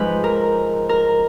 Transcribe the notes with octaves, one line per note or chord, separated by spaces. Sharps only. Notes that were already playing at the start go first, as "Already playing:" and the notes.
Already playing: G#2 F3 B4
A#4
A#4